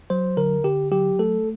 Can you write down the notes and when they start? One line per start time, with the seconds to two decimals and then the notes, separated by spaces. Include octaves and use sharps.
0.10 F#3 C5
0.37 D3 A#4
0.64 D3 G4
0.91 F#3 G4
1.19 A3 A4